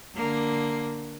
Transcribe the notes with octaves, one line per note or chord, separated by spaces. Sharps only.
D3 A#3